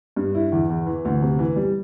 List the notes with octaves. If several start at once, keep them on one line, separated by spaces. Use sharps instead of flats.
G2
E4
E2
E2
E3
D2
C3
E3
G3